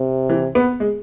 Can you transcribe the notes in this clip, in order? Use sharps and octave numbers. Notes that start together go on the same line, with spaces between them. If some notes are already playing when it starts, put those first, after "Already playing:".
Already playing: C3
E3
B3
G#3